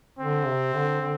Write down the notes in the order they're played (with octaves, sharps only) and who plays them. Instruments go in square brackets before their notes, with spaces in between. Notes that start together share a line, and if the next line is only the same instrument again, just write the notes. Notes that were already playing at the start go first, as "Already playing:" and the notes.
[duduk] D3 [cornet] C4
[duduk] C3
D3
D3